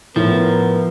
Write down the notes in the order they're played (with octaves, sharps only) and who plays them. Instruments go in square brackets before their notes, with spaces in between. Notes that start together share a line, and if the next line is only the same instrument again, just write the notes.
[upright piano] A2 [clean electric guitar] F3 [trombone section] B3 A#4